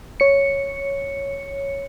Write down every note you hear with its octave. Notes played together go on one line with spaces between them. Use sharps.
C#5 C#7